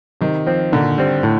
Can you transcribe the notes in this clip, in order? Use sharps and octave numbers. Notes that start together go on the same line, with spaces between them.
C3 D#3
F3 C4
A#2 D3
G3 C4
A2